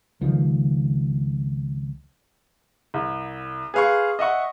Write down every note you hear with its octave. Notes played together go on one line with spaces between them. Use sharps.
C#2 D#3 F3
C2
G#4 B4 F5 C6 C#6
D#5 E5 F#5 C#6